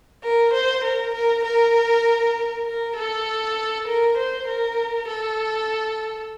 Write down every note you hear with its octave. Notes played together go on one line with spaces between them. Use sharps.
A#4
C5
A#4
A#4
A#4
A#4
A4
A#4
C5
A#4
A4